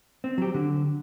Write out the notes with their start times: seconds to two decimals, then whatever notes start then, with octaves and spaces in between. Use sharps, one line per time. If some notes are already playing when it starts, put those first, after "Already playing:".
0.24 C4
0.38 F#3 G4
0.54 D3